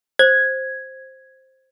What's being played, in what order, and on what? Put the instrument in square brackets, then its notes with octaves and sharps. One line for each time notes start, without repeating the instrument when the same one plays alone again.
[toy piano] C5 [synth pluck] G#6